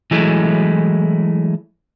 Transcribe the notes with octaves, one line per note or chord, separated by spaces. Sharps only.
E3 F#3 G#3 A3 E4